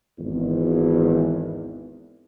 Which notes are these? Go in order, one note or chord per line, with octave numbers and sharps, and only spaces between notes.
G#1 E2